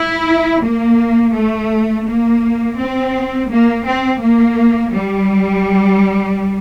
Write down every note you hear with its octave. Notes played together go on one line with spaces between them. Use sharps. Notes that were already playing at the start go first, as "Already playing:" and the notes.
Already playing: E4
A#3
A3
A#3
C4
A#3
C4
A#3
G3